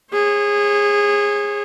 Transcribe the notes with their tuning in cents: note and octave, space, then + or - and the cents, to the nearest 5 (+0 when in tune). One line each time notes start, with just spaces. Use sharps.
G#4 -20 C#5 -45